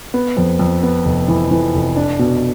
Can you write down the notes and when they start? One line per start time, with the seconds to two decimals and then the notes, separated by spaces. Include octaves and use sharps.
0.14 B3
0.37 F2
0.59 F2
0.83 B3
1.05 F1
1.28 E3
1.51 E3
1.74 F1
1.96 D4
2.19 B2